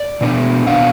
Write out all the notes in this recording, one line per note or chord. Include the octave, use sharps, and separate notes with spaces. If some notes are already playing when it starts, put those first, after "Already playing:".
Already playing: D5
B2 B3 D4
B2 B3 D4 F5